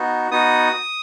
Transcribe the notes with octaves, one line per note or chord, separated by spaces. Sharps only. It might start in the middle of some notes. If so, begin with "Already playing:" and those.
Already playing: B3 D#4 F#4
B3 D#4 F#4 D#6